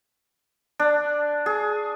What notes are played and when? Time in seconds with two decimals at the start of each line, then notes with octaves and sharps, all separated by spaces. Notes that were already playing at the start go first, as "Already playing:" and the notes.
0.80 D4
1.46 G#4